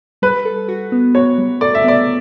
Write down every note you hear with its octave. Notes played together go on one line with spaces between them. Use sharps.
G3 B4
A4
F#4
B3
F#4 C#5
G3
A4 D5
E5
B3 D5